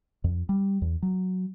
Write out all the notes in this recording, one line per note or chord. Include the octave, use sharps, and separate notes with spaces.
F2
G3
E2
F#3